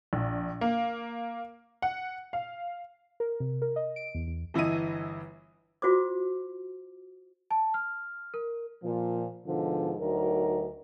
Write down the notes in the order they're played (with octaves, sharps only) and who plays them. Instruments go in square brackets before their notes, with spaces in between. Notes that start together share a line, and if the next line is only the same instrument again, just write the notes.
[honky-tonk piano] A#1
A#3
F#5
F5
[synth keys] A#4
C3
A#4
D#5
D7
E2
E2
[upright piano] G1 E3 E4 D#5 D#7
[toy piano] F4 F#4 C5 D6
[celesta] A5
F6
A#4
[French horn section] A#2 F3
G#2 B2 D3 F3
D2 F#3 D#4 A#4